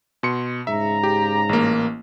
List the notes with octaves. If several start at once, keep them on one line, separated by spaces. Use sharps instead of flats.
B2 C6 C#7
G#2 C#3 E5 A#5
G4
A1 A#3